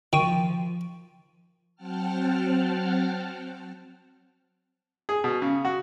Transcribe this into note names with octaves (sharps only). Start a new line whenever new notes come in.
D#3 F3 G5 C#6 D#7
F#3 C4 F#5 G5 A5 F6
G#4
B2
C#3
F#4